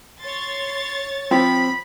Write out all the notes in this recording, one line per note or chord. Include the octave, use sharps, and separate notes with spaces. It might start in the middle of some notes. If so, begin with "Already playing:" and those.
C#5 C6 A6
F3 C4 B5